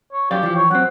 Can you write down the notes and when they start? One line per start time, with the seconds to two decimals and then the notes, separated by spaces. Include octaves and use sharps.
0.13 C#5
0.31 F#2 G4 D5 F5
0.43 E3 F3
0.56 C#5
0.71 F#2 C4 F#5